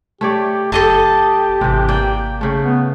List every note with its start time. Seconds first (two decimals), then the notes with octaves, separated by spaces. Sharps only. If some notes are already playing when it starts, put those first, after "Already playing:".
0.21 A3 G4 C#5 D5
0.72 F#1 G4 A4 D#5 A5
1.61 G#1 C3 E3
1.89 A#3 D5 G5
2.41 C#3 A3
2.63 B3